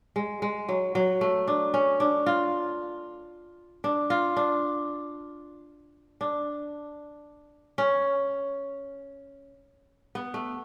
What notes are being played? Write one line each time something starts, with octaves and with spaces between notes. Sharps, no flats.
G#3
G#3
F#3
F#3
A3
D4
C#4
D4
F4
D4
F4
D4
D4
C#4
B3
A3